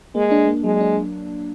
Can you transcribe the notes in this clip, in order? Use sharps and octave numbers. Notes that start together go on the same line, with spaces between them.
G#3 A#3
D4
A#3
F#3 G#3
D4